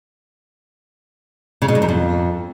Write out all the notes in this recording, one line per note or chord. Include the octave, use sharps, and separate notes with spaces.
C#3
B2
G2
F#2
F2